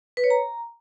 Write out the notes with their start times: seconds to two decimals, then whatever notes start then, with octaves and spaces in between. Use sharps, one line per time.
0.17 B4
0.24 C#5
0.30 A#5